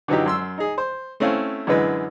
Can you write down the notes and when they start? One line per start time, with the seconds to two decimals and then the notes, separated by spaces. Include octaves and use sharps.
0.08 D3 E3 F#3 D#4 G4
0.26 F#2 C6 E6
0.58 D#4 G#4
0.78 C5
1.20 A3 C4 C#4 E4 F5
1.67 F#2 D3 E3 G#3 B4